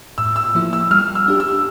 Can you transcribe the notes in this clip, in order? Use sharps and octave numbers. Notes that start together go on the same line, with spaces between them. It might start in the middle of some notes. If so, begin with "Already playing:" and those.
A2 E6
E6
F3 A#3 E4
E6
G3 F6
E6
D4 G4
E6